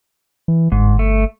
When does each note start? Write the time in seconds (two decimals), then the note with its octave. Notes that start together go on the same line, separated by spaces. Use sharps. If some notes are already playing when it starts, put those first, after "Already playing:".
0.48 E3
0.72 G1 G#2
0.99 A3